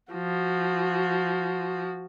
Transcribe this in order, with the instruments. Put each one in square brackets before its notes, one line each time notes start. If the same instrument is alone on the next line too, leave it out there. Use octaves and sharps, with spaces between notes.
[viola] F3 F#4